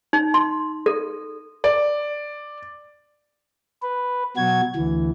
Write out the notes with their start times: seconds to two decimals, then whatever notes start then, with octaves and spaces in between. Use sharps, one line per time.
0.13 D#4
0.34 C6
0.86 A4
1.64 D5
3.83 B4
4.37 B2 F#3 F#4 G#6
4.76 D2 E3